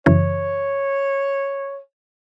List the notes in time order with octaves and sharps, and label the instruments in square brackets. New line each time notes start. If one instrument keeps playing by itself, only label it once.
[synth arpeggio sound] F#2 C#3 E3 [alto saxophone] C#5